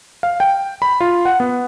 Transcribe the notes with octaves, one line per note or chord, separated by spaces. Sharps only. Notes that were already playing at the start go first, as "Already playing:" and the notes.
F5
G5
B5
F4
F#5
B3